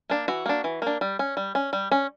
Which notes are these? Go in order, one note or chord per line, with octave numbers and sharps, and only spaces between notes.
A#3 D4
E3 F#4
A#3 D4
E3
A#3 D4
G3
C#4
G3
C#4
G3
C#4